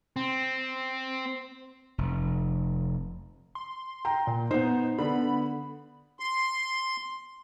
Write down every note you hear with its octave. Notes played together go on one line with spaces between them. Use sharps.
C4
F1
C6
G5 A#5
A#2
B3 D#4 C5
D3 B3 B5
C6